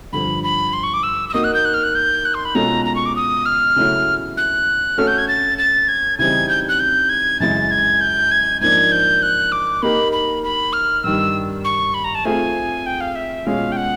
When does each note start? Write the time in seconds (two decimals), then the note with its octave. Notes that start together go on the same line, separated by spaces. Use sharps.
0.13 G2 D3 F3 B5
0.44 B5
0.73 C6
0.83 C#6
0.94 D6
1.03 E6
1.29 E6
1.34 A#3 D#4 F#4 D#6
1.44 F#6
1.54 G6
1.65 F#6
1.74 F6
1.83 F#6
1.95 G6
2.25 F#6
2.34 C6
2.45 B5
2.55 B2 G#3 C#4 F4 A4 A#5
2.85 A#5
2.95 C#6
3.06 D6
3.16 D#6
3.46 F6
3.76 C#3 F#3 A3 C#4 E4
4.37 F#6
4.98 A3 C#4 F#4 A4 F6
5.07 G6
5.18 G#6
5.28 A6
5.58 A6
5.88 G#6
6.19 C#3 E3 G3 C4 D#4 G#6
6.49 G6
6.69 F#6
6.80 G6
7.09 G#6
7.40 F#2 C#3 E3 G#3 A6
7.71 G#6
8.01 G6
8.31 G#6
8.61 G#2 F3 A#3 D4 G#6
8.92 G6
9.22 F#6
9.52 D6
9.82 A#3 D#4 G4 A#4 B5
10.12 B5
10.44 B5
10.73 F6
11.04 G2 D#3 G3 E6
11.64 C#6
11.94 B5
12.04 A#5
12.15 A5
12.25 A3 C4 F4 G#4 G#5
12.86 G5
13.01 F5
13.15 E5
13.46 B2 G#3 C#4 F4 G#4 F5
13.72 G5
13.77 F#5